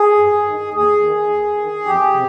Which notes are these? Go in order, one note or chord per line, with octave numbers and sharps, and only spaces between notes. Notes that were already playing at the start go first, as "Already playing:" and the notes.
Already playing: G#4
G2
D#3
D#2 G#4
D#3
D#2
D#3
F2 G4
C3